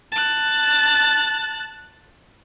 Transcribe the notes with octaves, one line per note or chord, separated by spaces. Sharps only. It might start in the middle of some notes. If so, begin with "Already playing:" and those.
A5 F#6